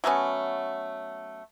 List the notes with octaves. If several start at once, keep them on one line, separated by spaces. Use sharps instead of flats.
F#3 A3 B3 C#4